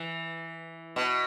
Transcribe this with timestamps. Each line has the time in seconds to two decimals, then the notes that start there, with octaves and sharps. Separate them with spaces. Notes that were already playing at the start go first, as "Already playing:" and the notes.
Already playing: E3
0.96 B2